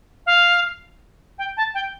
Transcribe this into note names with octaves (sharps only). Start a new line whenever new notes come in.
F5
G5
A5
G5